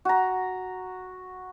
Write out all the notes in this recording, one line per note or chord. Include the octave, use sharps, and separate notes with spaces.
F#4 A#5